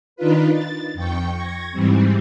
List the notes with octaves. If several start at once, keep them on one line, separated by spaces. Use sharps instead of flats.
D#3 D4 D#4 F4 B4
A6
F2 G5 C#6
C#6 G#6 A#6
G#2 E3 G3 C4